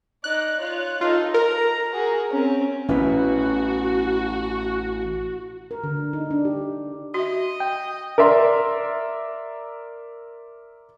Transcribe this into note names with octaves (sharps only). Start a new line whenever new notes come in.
D#4 D5 F#6
F4 C#5
D#4 F4 A4
A#4 A#5
F#4 G#4
C4 C#4
A1 B2 C#4 E4 F#4 B4
A#4
D3
D#4
D4
G4
F#4 D#5 E5
G5
A#4 D5 E5 C6